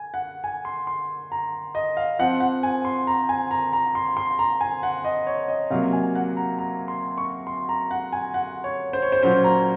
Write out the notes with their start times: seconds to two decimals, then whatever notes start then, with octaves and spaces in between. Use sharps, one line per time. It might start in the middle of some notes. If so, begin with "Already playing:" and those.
Already playing: G#5
0.14 F#5
0.44 G#5
0.65 C6
0.87 C6
1.32 A#5
1.75 D#5
1.97 F5
2.19 F3 C4 F#5
2.40 F#5
2.63 G#5
2.85 C6
3.07 A#5
3.29 G#5
3.51 A#5
3.73 A#5
3.95 C6
4.17 C6
4.39 A#5
4.61 G#5
4.83 F#5
5.05 D#5
5.27 C#5
5.48 D#5
5.70 C3 F#3 A#3 F5
5.93 G#5
6.15 F#5
6.37 A#5
6.59 A#5
6.88 C6
7.18 C#6
7.47 C6
7.69 A#5
7.91 F#5
8.13 G#5
8.34 F#5
8.64 C#5
8.93 C5
9.02 C#5
9.12 C5
9.23 A#2 F#3 C#4 C5
9.44 A#5